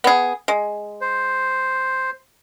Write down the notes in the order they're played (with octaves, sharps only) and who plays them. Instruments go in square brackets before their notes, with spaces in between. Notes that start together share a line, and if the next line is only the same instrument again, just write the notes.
[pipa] B3 G#4
G#3
[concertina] C5